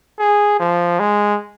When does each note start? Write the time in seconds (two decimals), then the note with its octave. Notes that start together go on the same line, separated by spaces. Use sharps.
0.20 G#4
0.60 F3
1.00 G#3